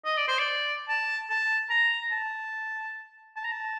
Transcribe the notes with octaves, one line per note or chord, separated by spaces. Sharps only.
D#5
D5
C5
D5
A5
A5
A#5
A5
A5
A#5
A5